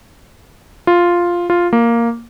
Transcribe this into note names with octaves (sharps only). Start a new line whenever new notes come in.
F4
F4
A#3